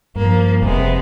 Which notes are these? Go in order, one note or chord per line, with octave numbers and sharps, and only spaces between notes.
G2 F3 A#3
F1 C3 G#3 B3